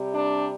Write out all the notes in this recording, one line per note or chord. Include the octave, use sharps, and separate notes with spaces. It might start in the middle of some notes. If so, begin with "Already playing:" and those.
Already playing: C3 G3
D4